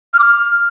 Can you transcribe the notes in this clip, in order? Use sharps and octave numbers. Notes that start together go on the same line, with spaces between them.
F6
D6
F6